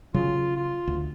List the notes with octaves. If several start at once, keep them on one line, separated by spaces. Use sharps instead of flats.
C#3 F#3 F4
F4
D2